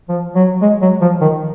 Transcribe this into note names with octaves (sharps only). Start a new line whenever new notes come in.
F3
F#3
G#3
F#3
F3
D#3